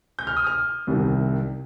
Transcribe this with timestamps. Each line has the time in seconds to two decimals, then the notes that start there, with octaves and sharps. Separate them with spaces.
0.19 G6
0.27 F6
0.37 D#6
0.47 F6
0.87 C2 C3 D#3